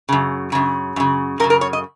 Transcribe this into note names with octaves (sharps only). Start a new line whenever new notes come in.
F#2 C#3
F#2 C#3
F#2 C#3
F#2 C#3 A#4
A#4
C#5
D#5